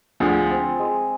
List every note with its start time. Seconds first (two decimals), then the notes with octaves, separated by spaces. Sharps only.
0.20 D2 D3 F3 G#4
0.50 C4
0.79 G#3